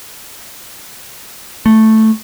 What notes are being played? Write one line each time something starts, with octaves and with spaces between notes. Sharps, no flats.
A3